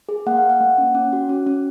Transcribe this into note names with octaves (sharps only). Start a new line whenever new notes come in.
G#4
A#3 F#5
F5
A#3
F#5
A#3
C#4
C#4
F#4
C#4
C#4